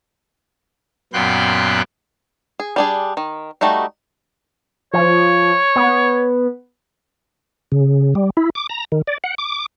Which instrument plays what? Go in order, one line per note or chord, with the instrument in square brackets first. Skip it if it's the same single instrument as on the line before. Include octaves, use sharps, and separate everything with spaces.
[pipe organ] F#2 A#2 B3 G5 C6 F#6
[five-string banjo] G#4
G3 D4 G#4
D#3
G3 A3 D#4 F#4
[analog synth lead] F3 [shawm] C#5
[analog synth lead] B3
[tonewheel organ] C#3
G3
E4
D6
A#5
D#3
D5
F#5
D6